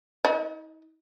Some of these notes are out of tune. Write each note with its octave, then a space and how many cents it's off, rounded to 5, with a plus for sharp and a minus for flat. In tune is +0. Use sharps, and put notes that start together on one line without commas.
D#4 +45 D#5 +0